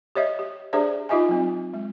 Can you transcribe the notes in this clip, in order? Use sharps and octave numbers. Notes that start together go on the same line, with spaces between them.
G4 C#5 D#5 E5
G4
D4 G4 G#4 C5 D5 E5
D#4 F4 G4 D#5 E5 G#5
F#3 C4
G#3